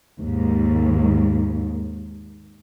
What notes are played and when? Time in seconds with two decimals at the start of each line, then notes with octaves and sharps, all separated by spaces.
0.19 D#2 G#2